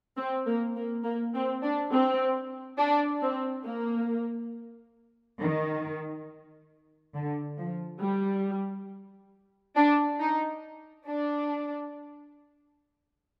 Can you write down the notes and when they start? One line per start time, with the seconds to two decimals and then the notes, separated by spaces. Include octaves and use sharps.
0.17 C4
0.46 A#3
0.76 A#3
1.04 A#3
1.34 C4
1.63 D4
1.92 C4
2.78 D4
3.22 C4
3.66 A#3
5.40 D#3
7.14 D3
7.58 F3
8.02 G3
9.76 D4
10.20 D#4
11.06 D4